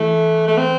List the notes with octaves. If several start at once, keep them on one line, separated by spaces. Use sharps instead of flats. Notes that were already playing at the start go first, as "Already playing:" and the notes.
Already playing: E3 A3
A3
C4